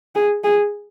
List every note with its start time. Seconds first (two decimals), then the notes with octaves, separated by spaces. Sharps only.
0.15 G#4
0.44 G#4